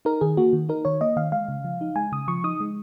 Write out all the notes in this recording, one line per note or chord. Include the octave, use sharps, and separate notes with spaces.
D#4 A#4
D#3 G#4
A#3 F#4
D#3
D#4 A#4
D#3 C#5
A#3 D#5
D#3 F5
G#3 F5
C#3
F3
D#4
G#3 G#5
C#3 D#6
F3 C#6
D#4 D#6
G#3